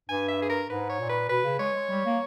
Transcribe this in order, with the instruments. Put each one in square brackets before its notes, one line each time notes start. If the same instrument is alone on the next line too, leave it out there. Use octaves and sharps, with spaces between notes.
[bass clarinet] G2 [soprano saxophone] G#5
[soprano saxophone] E5
G#4
A#4
[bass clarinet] G#2 [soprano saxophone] B4
[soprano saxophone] C#5
[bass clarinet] A#2
[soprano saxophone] B4
[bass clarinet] B2 [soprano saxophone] B4
[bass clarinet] C#3
[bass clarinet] G#3 [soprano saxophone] C#5
[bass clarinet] G#3
G3
A#3